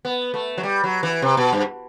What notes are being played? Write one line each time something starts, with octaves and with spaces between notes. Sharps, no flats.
B3
A3
F#3
G3
F#3
E3
C3
B2
G2